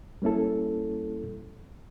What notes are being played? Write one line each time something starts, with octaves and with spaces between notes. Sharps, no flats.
G3 A#3 C#4 E4 A4